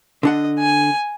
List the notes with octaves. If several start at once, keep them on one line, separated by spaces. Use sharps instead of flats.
D3 D4 D#5 F#5
G#5